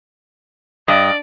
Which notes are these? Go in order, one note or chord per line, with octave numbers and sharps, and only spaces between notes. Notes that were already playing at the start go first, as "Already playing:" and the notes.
G2 D5 D#5